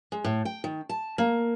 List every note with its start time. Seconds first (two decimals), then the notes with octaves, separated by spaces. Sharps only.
0.12 G#3
0.24 A2
0.45 G5
0.64 D#3
0.89 A5
1.18 A#3